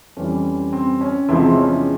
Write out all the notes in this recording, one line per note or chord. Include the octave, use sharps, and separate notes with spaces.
F2 E3 G3 C#4
C4
C#4
E2 C3 F3 G#3 C4 E4
C#4